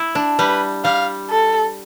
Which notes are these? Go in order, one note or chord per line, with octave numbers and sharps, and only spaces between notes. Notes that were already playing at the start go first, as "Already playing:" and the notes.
Already playing: E4
D4
G3 B4
G3 F5
A4